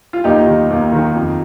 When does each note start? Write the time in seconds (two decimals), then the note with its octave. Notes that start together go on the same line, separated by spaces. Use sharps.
0.13 F4
0.24 D#2 D#4 G4
0.47 D#3
0.70 D#2
0.92 D#3
1.15 F2